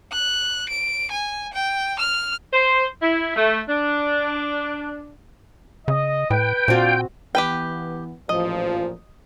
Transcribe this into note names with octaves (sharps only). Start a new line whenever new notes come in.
F#6
D7
G#5
G5
F6
C5
E4
A3
D4
C#3 D#5
A2 B4 G5
A#2 C4 D4 F4 F#4
E3 B3 G4 B4 G5
A1 A#2 F3 D#5